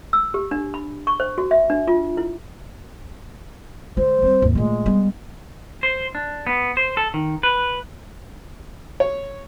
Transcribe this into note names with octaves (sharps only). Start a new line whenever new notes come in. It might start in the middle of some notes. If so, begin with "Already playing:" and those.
E6
G4
D4
B5
C#6
C5
F#4
E5
D4
F4
E4
D3 G#3 C5
G3 C4
D#2 G#2
A#2 G#3 A3
G3 B3
C5
D4
B3
C5
A4
D#3
B4
C#5